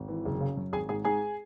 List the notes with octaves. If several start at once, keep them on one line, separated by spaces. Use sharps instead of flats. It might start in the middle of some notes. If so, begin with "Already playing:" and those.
Already playing: G#1
E3
F#1
C#3
F#2
G#1 G#4 G#5
G#2 G#4 G#5
G#2 G#4 G#5